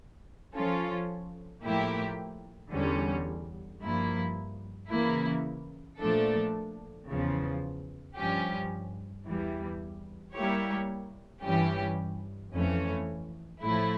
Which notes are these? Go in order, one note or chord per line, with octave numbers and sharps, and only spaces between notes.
F3 C#4 F4 A4
A2 F3 A#3 E4 G4
E2 D3 G3 C#4
G2 F3 A#3 E4
C#3 E3 A#3 E4
A#2 F3 A3 D4 A4
E2 C#3 F3
G2 F3 C#4 G4
E2 E3 G3
G3 A#3 E4 G4 C#5
G2 E3 G3 C#4 G4
F2 E3 A3 C#4
A2 F3 A3 E4